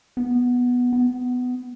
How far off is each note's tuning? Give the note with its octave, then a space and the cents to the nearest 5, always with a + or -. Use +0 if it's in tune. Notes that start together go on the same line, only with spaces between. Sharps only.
B3 -5
B3 +15